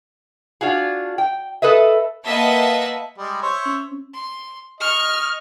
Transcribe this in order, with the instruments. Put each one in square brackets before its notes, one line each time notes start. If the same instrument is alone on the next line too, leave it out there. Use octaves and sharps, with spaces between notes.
[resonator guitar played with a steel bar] D4 F4 F#4 G#4
G5
A4 B4 D#5 E5
[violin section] A#3 B4 D#5 E5 F#5 A5
[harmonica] G3 G#3
C5 C#5 E5
[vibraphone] C#4
[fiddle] C6
[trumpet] D#5 [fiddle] C#6 [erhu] F6